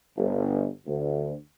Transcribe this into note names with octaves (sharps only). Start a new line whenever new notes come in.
G1
D2